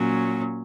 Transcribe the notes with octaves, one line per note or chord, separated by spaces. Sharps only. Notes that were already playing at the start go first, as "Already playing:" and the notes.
Already playing: A#2 F#3 C#4